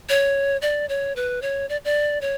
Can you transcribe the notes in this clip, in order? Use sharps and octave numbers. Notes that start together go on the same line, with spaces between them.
C#5
D5
C#5
B4
C#5
D5
D5
C#5